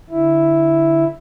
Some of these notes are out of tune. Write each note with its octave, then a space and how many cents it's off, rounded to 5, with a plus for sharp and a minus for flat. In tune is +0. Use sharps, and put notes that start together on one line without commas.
D3 +0 E4 +0